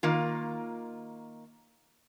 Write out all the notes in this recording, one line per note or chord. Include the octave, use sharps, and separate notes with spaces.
D#3 A#3 F4